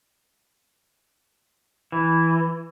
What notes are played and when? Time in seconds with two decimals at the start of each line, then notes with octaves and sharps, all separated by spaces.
1.92 E3